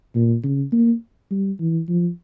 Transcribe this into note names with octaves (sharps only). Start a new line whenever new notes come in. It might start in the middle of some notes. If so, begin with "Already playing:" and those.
A#2
C#3
A#3
G3
E3
F3